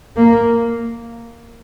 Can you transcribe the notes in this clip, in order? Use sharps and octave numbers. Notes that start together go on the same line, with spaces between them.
A#3